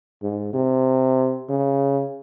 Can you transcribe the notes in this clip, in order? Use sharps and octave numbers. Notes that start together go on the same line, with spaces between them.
G#2
C3
C#3